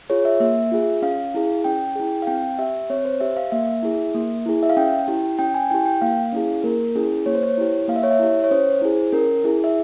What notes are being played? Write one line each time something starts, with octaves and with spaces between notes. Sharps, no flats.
F4 G#4 C#5
E5
A#3 E5
F4 G#4
C#4 F5
E4 G#4
C#4 G5
E4 G#4
F5
C4 G5
G4 E5
C4 C#5
C5
G4 E5
F5
A#3 E5
E4 G#4
A#3
E4 G#4
E5
F5
C#4 G5
E4 G4
C#4 G5
G#5
E4 G4 G5
G5
A#3 F5
C#4 E4 G#4
A#3 A#4
C#4 E4 G#4
A#3 C#5
C5
C#5
E4 G4
A#3 F5
E5
C#5
E5
E4 G4
C#5
C#4 C5
E4 G#4
C#4 A#4
E4 G#4
E5